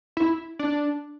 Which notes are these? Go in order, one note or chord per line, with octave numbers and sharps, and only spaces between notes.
E4
D4